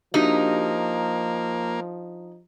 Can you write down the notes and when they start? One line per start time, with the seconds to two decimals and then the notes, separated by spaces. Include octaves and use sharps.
0.14 F3 A#3 D4 D#4 F#4 G4